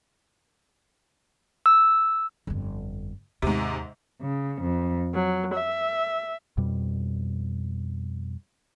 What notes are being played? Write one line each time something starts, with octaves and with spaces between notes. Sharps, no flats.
E6
G1 F2
D#2 G#2 C3
C#3
F2
F#3
E5
F2 B2 G3